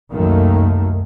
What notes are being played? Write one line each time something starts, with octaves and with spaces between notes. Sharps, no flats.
C2 F#2 D#3 A3 A#3